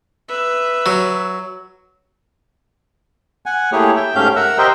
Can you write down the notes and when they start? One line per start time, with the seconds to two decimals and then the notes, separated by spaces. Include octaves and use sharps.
0.29 B4 E5
0.86 F#3
3.46 F#5 G#5
3.72 A3 A#3 E4 G4 G#4 C#5
3.96 E5 G5
4.15 G#2 A3 C#4 G4 F5 G6
4.36 A#4 E5 F#5 A#5 E6
4.58 G4 A#4 C5 D#5 E5 G5